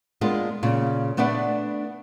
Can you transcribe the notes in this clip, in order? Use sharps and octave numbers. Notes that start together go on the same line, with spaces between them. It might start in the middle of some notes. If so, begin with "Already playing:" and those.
G#3 A#3 B3 D4 F4
A#2 C#3
A3 B3 D4 B4 D5 F#5